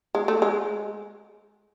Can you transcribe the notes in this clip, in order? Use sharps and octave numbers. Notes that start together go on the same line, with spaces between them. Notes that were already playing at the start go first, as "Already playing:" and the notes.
G#3
A3
G#3